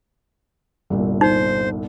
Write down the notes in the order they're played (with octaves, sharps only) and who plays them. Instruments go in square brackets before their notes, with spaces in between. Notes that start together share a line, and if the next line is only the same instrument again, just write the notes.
[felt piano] G1 C2 A#2
[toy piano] D#4 [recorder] C5